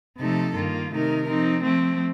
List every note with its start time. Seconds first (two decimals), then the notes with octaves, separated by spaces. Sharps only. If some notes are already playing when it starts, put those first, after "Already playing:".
0.17 C3 F3 A3 D#4 A4
0.54 G2 D#3 A#3 F4
0.91 C3 D#3 A3 D#4 A#4
1.28 F3 C4 D#4
1.64 F3 A3 C4